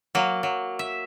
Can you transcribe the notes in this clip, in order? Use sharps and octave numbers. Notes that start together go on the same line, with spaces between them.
F#3 A#3
F#3
E5